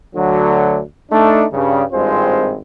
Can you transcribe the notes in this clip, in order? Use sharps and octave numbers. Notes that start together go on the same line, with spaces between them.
D2 D3 F#3
A3 D4 D#4
G2 C#3
G#1 G2 G#3 C4 F4 C5